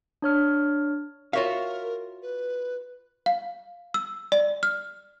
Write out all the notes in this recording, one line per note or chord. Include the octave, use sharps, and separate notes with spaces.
D4 C#5 F6
F4 F#4 A#4 C#5 E5 F5
B4
F5
E6
D5
F6